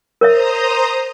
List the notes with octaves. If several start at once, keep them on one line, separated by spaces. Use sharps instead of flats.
A#4 C5 C#5 E5 A#5 D#6